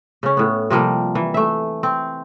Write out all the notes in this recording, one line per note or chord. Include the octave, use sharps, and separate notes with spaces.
C#3 C#4
A2 B3
C3 F3 G3 A#3
E3
A3 E5
C4